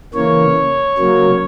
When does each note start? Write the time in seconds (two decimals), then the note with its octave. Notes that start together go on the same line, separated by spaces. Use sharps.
0.14 C#3 E3 A#3 C#5
0.97 C#3 F#3 A#3